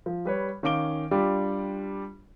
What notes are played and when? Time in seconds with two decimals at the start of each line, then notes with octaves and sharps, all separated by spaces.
0.06 F3
0.25 G3 B4 C#5
0.63 D#3 C#4 F5 D6 D7 G7
1.11 G3 D4 F4 G4